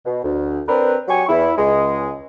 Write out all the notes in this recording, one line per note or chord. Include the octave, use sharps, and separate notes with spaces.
B2
D2
C4 D4 A#4 B4
F#3 G4 G#5 C#6
E2 E4 B5
C#2 G#3 G#4